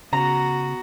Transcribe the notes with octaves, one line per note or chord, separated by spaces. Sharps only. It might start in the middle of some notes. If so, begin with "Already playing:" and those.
C#3 B3 F#4 A#5